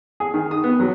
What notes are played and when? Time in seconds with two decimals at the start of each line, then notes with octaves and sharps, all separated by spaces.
0.20 G#4
0.34 D#3
0.51 D#6
0.64 B3
0.80 F#3